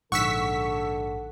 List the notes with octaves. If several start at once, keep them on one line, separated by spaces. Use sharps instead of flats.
A#1 G#2 D3 A4 F#5 C#6 E6 B6